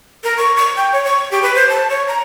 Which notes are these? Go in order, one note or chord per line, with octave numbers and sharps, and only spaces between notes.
A#4
C#6
C#6
G5
C#5
C#6
G4
B4
C5
A5
C#5
A#5